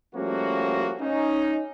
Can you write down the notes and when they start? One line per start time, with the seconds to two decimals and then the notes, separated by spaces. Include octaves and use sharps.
0.15 F3 G3 A3 A#3 C#4 F#4
1.01 C#4 D#4